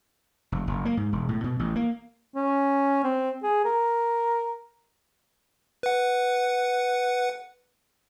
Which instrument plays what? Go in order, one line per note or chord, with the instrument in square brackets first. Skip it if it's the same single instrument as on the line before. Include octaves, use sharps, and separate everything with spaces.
[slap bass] F1
F#1
A#3
G#2
E1
A2
B2
A1
A#3
[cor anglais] C#4
C4
G#4
A#4
[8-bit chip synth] B4 F#5